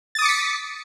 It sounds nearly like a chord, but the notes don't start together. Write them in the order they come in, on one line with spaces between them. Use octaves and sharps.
A6 D#6 D6 C#7 B6